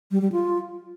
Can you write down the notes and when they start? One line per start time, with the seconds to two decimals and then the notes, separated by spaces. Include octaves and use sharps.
0.11 G3
0.22 G3
0.32 F4